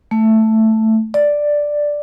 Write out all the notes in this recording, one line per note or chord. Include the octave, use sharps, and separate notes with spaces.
A3
D5